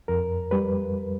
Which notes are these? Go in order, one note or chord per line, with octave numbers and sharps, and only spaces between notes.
F2 A#4
G3 B4